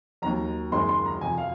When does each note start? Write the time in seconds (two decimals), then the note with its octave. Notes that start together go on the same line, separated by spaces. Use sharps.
0.22 D#2 D#3 F#3 A#5
0.71 F#1 F#2 D#3 G#3 C6
0.89 C6
1.06 A#5
1.21 F2 C3 F3 G#5
1.38 F5